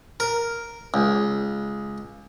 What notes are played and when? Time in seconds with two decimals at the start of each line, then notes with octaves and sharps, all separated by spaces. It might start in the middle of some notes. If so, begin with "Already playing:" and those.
0.20 A#4
0.94 C#2